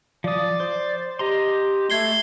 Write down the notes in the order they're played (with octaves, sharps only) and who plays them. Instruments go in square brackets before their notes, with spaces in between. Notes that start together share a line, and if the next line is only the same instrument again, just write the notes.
[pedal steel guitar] F3 D#6 [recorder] D5
[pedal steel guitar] C5
[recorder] G4 [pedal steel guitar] D#5 A#5 C6
[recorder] A3 [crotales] G#6 C7 G7